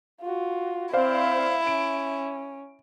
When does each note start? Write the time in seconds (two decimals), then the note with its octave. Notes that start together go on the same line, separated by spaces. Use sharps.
0.21 F4 F#4
0.94 C4 E4 C5 D5 F5
1.67 C#4 D7